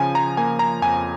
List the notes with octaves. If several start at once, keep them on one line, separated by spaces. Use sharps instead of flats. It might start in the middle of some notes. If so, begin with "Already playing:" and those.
Already playing: C#3 F3 G#5
A#5
A#3 G#5
A#5
F2 G#5